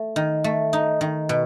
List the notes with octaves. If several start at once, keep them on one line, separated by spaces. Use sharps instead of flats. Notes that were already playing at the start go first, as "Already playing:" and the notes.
Already playing: A3
D#3
A3
D#4
D#3
B2